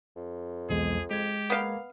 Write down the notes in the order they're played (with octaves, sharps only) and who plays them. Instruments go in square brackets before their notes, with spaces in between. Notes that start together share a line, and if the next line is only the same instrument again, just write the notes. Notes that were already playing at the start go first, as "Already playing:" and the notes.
[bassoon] F2
[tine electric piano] B1 E2 G#3 [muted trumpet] G#4
[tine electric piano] G#3 G#6 [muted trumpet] G4
[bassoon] A#3 [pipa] B3 F5